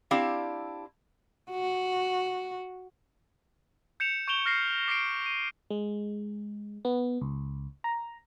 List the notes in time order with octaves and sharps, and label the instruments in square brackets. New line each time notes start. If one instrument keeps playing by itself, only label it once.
[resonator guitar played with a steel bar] C4 D4 E4 G4 F5
[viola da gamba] F#4
[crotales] G6 C#7 E7 F7
C#6 G6 D7 E7 F7 G7
F6 A#6 C7 C#7
D6 A#6 C7 D7
D#7
[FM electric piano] G#3
B3
C#2
A#5